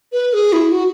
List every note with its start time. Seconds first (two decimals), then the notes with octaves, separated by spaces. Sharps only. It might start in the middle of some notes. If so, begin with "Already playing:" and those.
0.13 B4
0.33 G#4
0.53 E4
0.72 F#4